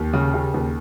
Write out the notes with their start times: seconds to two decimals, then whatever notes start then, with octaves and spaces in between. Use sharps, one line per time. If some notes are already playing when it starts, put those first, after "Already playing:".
Already playing: D#2 G4
0.13 C#3
0.34 C#3
0.54 D#2